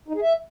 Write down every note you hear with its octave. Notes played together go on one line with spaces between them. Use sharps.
D#4
G#4
E5